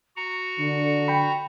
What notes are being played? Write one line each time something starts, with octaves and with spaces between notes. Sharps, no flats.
F#4 A#5 C#7
D3
G5 B5